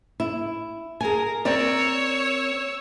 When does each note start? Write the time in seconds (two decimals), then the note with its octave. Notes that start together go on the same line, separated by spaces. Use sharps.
0.20 E4
1.01 G#4 A#4 G#5
1.45 C4 A#4 C#5 D5 E6